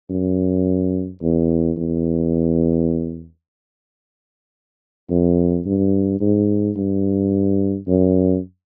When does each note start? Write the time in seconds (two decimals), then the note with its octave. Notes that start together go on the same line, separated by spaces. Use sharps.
0.10 F#2
1.22 E2
1.77 E2
5.10 F2
5.66 G2
6.21 G#2
6.77 G2
7.88 F#2